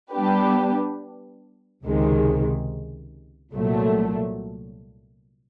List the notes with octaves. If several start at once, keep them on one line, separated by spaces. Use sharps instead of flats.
G3 B3 D4 G4 B4
C#2 C3 D#3 G#3
C2 A#2 F#3 A3